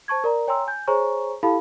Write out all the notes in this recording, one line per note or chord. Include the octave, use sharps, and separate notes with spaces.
C5 A5 C#6 G#6
A#4 D5 A#5
C#5 G5 G#5 A#5 C6 E6
G#5 G6
G#4 C5 C#5 G#5 A#5 C#6
E4 G4 A4 F5 A5 B5